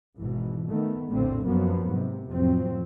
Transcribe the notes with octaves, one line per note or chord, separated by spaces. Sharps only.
G#1 B2 E3
D#3 A3 B3
F1 A#1 A2 D3 A3 C4
F#2 F3 F#3 A#3 B3
G#2 C3
A1 F2 F#3 C4